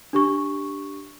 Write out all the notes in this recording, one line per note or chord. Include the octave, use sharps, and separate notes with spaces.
D4 G4 C#6